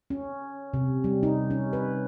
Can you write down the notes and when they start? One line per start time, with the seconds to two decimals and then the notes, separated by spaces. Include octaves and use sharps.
0.10 C#4
0.74 C3
1.04 G3
1.23 D#4
1.50 C#4
1.73 B4